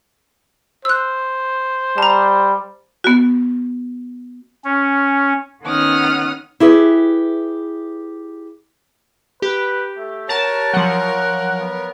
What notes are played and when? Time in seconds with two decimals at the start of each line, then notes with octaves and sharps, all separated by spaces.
0.85 C5 E6 F#6
1.98 G3 A5 A#5
3.04 B3 F#4
4.65 C#4
5.63 D#3 B3 C#4 F#5 D#6 F6
6.60 E4 G4 G#4 B4
9.42 G4 B4
9.97 A3
10.29 F#4 A#4 C#5 A5
10.73 F3 F#3 F#5
11.60 B3